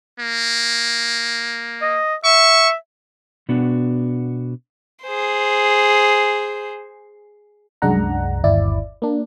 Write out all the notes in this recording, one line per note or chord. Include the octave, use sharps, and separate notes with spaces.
A#3
D#5
E5 C#6
B2 B3 D4 F#4
G#4 C5
C2 F#2 G#3 D4 F#5 A#5
G1 D#2 E4 D5
A#3 D4